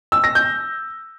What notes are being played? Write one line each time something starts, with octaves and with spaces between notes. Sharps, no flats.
E6
A#6
G6